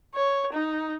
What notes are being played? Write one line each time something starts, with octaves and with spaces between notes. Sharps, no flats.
C#5
D#4